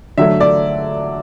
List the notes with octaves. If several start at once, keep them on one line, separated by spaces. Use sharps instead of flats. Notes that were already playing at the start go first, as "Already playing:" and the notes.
D3 F#3 A3 E5
D5